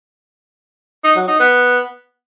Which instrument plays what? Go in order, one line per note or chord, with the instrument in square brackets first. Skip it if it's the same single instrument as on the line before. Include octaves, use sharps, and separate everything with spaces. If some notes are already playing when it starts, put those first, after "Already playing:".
[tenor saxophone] D#4
F#3
D#4
B3